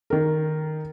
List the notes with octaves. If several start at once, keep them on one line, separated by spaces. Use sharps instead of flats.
D#3 A#4